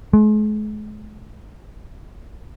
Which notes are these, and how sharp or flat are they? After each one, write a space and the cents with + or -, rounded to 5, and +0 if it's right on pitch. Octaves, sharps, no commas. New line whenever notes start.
G#3 +40